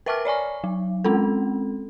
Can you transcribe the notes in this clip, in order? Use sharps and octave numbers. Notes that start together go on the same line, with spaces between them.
A#4 B4 E5 A5 D6 F6
C#5 D5 G#5 C#6
F#3
G#3 C4 C#4 A4